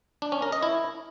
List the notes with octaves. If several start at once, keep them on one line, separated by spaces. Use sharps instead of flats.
D4
C#4
A#4
D#5
E4